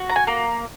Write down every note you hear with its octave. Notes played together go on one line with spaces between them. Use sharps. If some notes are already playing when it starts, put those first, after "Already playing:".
Already playing: F#4
A#5
G#5
A#3